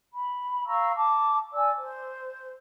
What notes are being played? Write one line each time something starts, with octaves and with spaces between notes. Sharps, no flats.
B5
F5 A#5 C#6 E6
A5 D6
D5 G#5 E6
C5